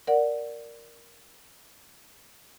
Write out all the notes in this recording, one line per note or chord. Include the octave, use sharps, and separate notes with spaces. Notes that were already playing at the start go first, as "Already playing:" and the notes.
A#4 D5 F#5